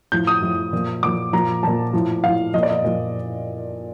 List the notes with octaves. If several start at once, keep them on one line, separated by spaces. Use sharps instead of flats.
A2 F3 G6
D#6
A2 F3
A#2 F3
A#2 F3 D6
A#2 F3 A#5
A#2 F3 A5
A2 F3
A2 F3 F5
A#2 F3 D#5
D5
D#5
A#2 F3